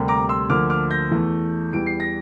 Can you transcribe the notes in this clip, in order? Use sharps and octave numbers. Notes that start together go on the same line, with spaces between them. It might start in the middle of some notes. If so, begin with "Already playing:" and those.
Already playing: D2 C3 G3 A#3
A#5 D6
C6 E6
D2 D3 F3 A#3 D6 F6
D6 F6
G6 A#6
E2 E3 A3
E2 E3 G3 D7
C7
A#6